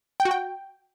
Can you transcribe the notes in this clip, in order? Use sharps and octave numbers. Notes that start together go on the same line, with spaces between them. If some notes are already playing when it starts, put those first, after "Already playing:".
G5
F#4
G5